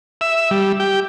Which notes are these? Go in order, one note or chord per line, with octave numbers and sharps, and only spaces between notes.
E5
G3
G4